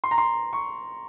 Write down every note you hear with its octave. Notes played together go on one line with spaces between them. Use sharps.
C6
A#5
C6
C#6